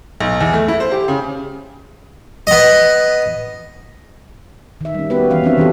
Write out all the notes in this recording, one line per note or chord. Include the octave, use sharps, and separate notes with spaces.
B1
E2
A3
E4
C5
G4
C#3
B3 D#5
D#3 E5
G3 C#4
B3 F#4 G4 B4
E3 B3 C#4 F5
F3 C4 D4 F#4 E5
D#3 E3 C#4 G4 A4